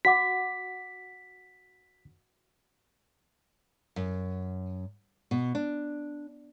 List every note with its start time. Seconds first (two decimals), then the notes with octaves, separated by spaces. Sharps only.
0.05 F#4 F#5 D6 B6
3.96 F#2
5.31 B2
5.55 D4